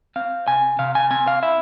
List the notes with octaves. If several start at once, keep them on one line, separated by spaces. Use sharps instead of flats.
C4 F5
C3 G#5
C3 F5
G#5
C4 G#5
F5
E4 E5